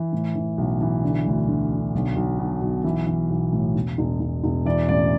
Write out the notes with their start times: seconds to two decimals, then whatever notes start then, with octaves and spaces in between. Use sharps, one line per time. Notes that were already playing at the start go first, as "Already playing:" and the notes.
Already playing: E3
0.13 A2
0.36 E3
0.58 B1
0.81 E3
1.03 D3
1.26 D2
1.48 D2
1.71 D3
1.94 B1
2.16 B1
2.39 B2
2.62 B1
2.84 E3
3.07 E3
3.30 B1
3.53 A2
3.75 E1
3.98 E1
4.20 E1
4.43 E1
4.65 E3 D5
4.89 A1 D5